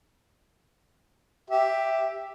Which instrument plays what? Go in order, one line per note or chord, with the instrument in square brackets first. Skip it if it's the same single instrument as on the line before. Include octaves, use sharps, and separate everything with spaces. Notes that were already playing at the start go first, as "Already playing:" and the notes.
[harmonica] G4 E5